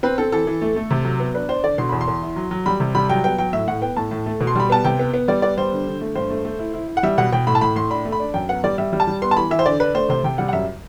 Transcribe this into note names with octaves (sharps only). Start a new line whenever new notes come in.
C4 B4
C4 A4
E3 A4
E3
A3
A3
C3
F#3
B3
D4 B4
D4 C5
D3 D5
B2 C6
E2 B5
C6
E2
E4
F#3
F#3
G3 B5
C3
G3 B5
F#3 G5
B3 G5
F#3 G5
A2 E5
A2 F#5
B3 G5
A2 A5
A2
A3
B2
C6
G3 B5
B3 A5
C3 G5
B3
B3
G3 D5
B3 D5
G3 C5
D3
D3
A3
G2 C5
A3
A3
E4
E4
E4
F#5
G3 E5
B2 F#5
B2 G5
A2 B5
A5
A2 B5
A2 C6
D4 B5
A3
B5
D4
F#2 G5
B3 F#5
G3 D5
G3 E5
G3
A5
G3
B3 C6
A5
E3 B5
E3 E5
C5
D3 D5
D4 B4
A3 C5
C3 C5
C3 G5
G3 F#5
F#5
F#2 E5